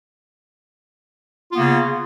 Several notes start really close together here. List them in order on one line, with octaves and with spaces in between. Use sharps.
F4 B3 A#3 C#3